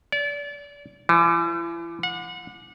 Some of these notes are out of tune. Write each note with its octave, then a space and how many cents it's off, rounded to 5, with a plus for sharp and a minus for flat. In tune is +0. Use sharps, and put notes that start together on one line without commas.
D5 -30
E3 +40
F#5 -30